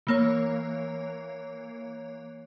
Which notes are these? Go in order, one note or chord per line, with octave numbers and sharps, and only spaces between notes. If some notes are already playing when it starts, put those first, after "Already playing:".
E3 A#3 C#5